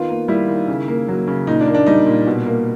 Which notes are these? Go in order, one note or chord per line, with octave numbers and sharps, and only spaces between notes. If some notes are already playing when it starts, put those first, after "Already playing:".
Already playing: D#3 B3 F4
A#3
G3 E4
D#3
C#3
A#3
F#3
C#3
A#2 D#4
D4
A#3
D4
G3 D#4
A#2
B2
A#3